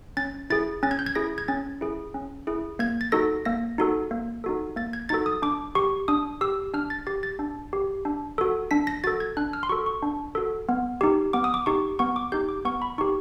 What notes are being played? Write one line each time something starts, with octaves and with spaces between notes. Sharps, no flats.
C#4 A6
E4 G#4 A6
C#4 A6
G#6
G6
G#6
E4 G#4 A#6
G#6
C#4 A6
E4 G#4
C#4
E4 G#4
A#3 G#6
A6
D#4 F#4 A4 A#6
A#3 A#6
D#4 F#4 A4
A#3
D#4 F#4 A4
A#3 A6
G#6
D#4 F#4 A4 A6
D#6
D4 D6
G4 C#6
D4 D#6
G4 E6
D4 F6
A6
G4 A6
A6
D4
G4
D4
F#4 A4
D4 B6
A#6
F#4 A4 A6
G#6
D4 F#6
F6
C6
F#4 A4 C#6
C#6
D4
F#4 A4
B3
D#4 G4
B3 D6
D#6
D6
D#4 G4 C#6
B3 C#6
D6
D#4 G4 G6
D6
B3 C#6
B5
D#4 G4 C#6